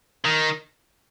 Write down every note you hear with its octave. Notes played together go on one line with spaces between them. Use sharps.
D#3